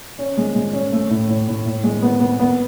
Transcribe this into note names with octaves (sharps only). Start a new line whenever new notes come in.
C#4
G#3
G#3
C#4
A3
A2
A2
A2
A2
G#3
B3
B3
B3